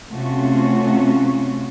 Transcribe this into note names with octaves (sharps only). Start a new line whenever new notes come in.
C3 A3 C#4 F4 F#4